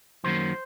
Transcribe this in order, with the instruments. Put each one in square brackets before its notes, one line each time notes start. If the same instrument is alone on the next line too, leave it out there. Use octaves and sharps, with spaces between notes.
[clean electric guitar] F#2 D#3 F#3 A#3 C5